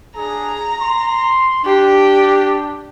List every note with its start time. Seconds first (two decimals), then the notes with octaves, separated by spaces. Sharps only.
0.17 D4 G#4 A#5
0.81 C6
1.65 D4 G4